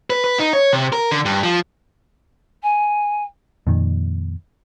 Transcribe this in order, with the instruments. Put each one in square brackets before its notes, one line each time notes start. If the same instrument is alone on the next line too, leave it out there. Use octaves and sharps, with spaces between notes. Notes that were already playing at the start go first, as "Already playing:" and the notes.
[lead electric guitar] B4
B4
D#4
C#5
C3
A#4
D3
G2
F3
[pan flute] G#5
[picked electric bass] F2 A#2 D#3